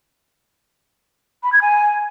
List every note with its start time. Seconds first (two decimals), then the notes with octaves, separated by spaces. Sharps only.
1.43 B5
1.53 G#6
1.62 G#5